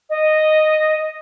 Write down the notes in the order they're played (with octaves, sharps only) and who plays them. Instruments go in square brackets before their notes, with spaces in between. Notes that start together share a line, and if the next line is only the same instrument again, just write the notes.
[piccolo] D#5